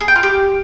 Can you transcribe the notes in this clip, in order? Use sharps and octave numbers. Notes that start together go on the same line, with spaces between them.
G#4
G5
F4
G4